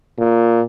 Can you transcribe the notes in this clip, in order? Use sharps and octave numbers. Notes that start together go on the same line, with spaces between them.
A#2